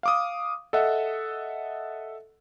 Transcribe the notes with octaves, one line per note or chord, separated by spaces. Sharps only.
F5 D6 D#6
A4 D#5 E5 F#5